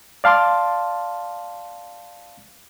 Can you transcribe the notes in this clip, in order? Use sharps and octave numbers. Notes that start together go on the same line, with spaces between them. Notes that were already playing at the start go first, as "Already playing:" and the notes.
D5 F5 A5 C6 D6